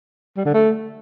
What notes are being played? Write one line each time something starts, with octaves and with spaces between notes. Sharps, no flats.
G3
D3
A3